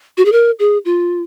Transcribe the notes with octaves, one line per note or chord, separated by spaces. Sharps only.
F#4
G#4
A#4
G#4
F4